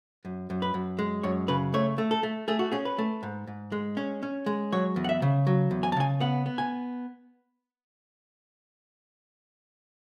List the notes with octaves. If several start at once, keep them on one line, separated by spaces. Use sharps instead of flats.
F#2
F#2
B4
F#2
G#3
F#2 C#5
C#3 B4
A3 C#5
A3
A4
A3
A3 G#4
F#4
C#4 G#4
B4
A3
G#2
G#2
G#3
C#4
C#4
G#3
F#3 C#5
E2
F#5
E5
C#3
F#3
E2
G#5
A5
C#3 G#5
B3 F#5
B3
G#5